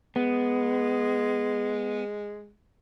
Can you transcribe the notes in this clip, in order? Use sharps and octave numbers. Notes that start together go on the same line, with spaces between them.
G#3 B3